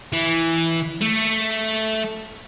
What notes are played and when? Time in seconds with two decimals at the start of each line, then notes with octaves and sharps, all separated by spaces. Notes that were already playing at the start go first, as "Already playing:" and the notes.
0.13 E3
1.01 A3